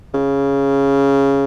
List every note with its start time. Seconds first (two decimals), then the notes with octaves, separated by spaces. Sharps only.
0.14 C#3